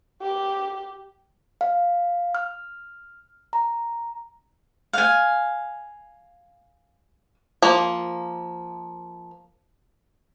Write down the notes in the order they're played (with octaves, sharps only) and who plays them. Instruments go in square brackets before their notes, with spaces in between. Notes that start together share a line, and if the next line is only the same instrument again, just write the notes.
[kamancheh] G4
[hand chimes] F5
F6
A#5
[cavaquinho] F5 G#5
[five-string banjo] F3 A#3